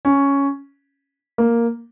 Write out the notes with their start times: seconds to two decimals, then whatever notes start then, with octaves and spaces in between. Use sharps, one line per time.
0.05 C#4
1.38 A#3